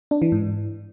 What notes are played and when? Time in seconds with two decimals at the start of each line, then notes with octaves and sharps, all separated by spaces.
0.11 D4
0.22 E3
0.32 G#2